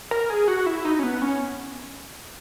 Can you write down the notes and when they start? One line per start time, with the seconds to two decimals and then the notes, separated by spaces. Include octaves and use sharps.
0.11 A#4
0.30 G#4
0.48 F#4
0.66 E4
0.85 D#4
0.99 C#4
1.03 B3
1.22 C#4